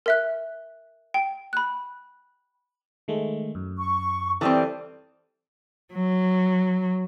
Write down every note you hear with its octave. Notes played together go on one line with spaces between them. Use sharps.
A#4 E5 F#6
G5
B5 F#6
D#3 G#3 A3
F#2
C#6
E3 G3 C4 A4 G5 A5 D#6
F#3